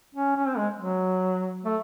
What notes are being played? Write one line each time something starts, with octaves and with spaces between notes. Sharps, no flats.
C#4
C#4
C4
G#3
F#3
A3